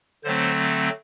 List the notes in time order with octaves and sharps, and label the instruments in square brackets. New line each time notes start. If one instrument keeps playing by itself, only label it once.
[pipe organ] D3 F#3 A3 C4 C5